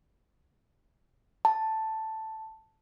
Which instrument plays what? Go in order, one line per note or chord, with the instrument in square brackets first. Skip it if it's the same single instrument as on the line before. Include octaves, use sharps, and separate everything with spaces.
[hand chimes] A5